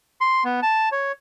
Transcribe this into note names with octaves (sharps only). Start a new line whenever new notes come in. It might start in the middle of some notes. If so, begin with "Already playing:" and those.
C6
B3
A5
C#5